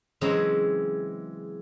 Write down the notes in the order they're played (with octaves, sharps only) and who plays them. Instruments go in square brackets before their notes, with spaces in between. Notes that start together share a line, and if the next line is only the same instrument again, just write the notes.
[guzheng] C#3 E3 F#3 G#3 C4 C#4